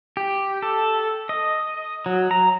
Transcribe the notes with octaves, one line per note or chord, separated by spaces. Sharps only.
G4
A4
D#5
F#3
A#5